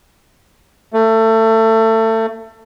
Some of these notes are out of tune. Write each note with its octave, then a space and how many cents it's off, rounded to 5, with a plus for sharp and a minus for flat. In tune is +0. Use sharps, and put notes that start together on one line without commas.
A3 +25